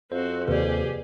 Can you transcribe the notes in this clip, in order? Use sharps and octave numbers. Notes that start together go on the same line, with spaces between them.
F2 C4 F#4 C5
D#2 C3 G4 G#4 B4 D5